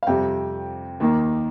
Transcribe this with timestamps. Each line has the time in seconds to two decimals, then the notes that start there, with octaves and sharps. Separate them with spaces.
0.03 F5
0.07 F2 C3 G3 G5
1.00 D#2 D#3 A#3